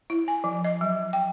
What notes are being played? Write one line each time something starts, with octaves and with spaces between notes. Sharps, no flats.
E4
G#5
F3
D#5
F#3
G5